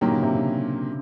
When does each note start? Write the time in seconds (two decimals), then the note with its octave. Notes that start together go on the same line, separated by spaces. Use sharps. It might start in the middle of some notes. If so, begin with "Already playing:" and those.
0.01 A#2 D3 F#3 A#3 D#4 G4
0.12 C#3
0.23 C3
0.34 C#3